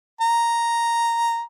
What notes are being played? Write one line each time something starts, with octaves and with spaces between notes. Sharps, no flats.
A#5